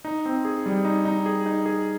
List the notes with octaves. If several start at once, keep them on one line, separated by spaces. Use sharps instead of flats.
D#4
C4
G#4
G3
D#4
D#4
G#4
D#4
G#4